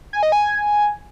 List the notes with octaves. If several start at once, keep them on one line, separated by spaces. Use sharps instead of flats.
G#5
D#5
G#5